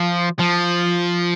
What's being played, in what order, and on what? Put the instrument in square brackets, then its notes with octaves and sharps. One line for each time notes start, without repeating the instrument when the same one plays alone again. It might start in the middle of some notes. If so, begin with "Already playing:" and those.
Already playing: [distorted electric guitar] F3
F3